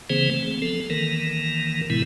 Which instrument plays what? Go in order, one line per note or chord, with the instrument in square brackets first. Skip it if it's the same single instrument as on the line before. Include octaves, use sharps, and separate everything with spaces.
[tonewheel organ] C#3 E3 A#3 C4 G#4 C5
A3 C4
F3 B3 A4
D#3 E3 A#3 A#4
A2 C3 E3 G#3 B3 E4